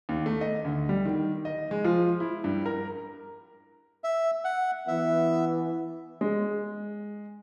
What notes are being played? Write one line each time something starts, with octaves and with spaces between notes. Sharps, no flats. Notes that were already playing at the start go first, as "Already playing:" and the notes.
D#2
A3
D#5
D2
G3
D#3
D#5
G#3
F3
E4
G2
A#4
E5
F#5
E3 B3 E5
G#3